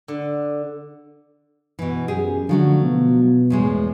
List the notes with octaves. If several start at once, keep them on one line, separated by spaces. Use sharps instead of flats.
D3
B2 E3
F#2 G4 G#4
D3 F3 F#3 A3
B2
E2 A2 G#3